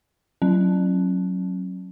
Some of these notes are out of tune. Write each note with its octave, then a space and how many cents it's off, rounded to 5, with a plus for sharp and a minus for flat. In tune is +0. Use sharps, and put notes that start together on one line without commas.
F#3 +0 C#4 -40